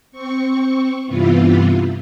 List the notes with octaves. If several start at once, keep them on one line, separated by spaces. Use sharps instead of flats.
C4 C#6
G2 C3 E3 B3 E4 F4